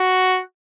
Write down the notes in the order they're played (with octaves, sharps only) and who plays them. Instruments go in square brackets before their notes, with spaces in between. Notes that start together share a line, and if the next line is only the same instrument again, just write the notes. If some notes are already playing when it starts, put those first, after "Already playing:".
Already playing: [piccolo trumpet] F#4